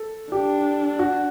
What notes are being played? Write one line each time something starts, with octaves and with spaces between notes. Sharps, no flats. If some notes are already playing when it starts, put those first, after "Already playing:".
Already playing: A4
D4 G4
F#4